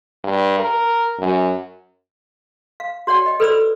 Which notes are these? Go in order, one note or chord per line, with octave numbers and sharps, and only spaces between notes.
G2
A#4
F#2
F5
F#4 C#5 D5 F#5 G5
D#5 G5
A4 B4 C5 D5 B5 E6